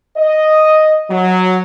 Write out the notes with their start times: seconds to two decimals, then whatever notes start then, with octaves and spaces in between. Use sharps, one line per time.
0.17 D#5
1.10 F#3